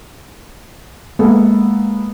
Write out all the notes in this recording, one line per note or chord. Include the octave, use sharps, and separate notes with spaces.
G#3 A#3 B3 A4